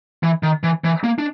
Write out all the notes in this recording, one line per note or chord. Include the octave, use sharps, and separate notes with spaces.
E3
D#3
E3
E3
A#3
D4